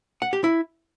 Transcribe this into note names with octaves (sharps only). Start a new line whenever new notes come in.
F#5
G4
E4